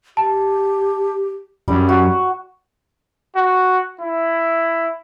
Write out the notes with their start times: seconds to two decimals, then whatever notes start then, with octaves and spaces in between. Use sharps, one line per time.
0.17 G4 A5
1.68 F#2 G3
1.89 F#4
3.36 F#4
4.01 E4